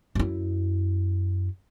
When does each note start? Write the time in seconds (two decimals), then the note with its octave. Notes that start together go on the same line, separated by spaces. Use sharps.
0.15 F#2 E4